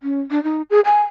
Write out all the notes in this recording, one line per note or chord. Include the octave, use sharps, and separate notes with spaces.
C#4
D4
D#4
G#4
G#5